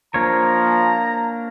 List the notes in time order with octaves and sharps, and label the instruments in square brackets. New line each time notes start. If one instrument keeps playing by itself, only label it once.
[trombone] F3 [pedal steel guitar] A#3 D4 C#5 [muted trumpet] A#5